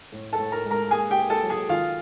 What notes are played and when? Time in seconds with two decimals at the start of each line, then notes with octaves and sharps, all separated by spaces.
0.12 A2
0.33 A4 A5
0.38 A2
0.52 A#4 A#5
0.65 G#3
0.71 A#4 A#5
0.91 A#3 G#4 G#5
1.10 G4 G5
1.17 A#3
1.30 A4 A5
1.43 F#3
1.50 G#4 G#5
1.69 D#3 F4 F5